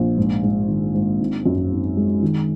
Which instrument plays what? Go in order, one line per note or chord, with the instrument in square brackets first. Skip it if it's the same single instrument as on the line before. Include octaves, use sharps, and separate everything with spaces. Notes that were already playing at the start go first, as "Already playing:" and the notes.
Already playing: [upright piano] A#1
G#2
G#2
D#3
G#2
G#1
F#2
G#1
G#3
D#3